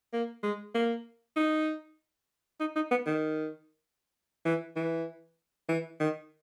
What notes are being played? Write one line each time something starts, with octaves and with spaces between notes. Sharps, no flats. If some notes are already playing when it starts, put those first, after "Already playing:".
A#3
G#3
A#3
D#4
D#4
D#4
B3
D#3
E3
E3
E3
D#3